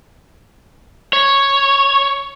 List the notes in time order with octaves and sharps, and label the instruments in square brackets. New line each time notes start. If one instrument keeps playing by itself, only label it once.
[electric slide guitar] C#5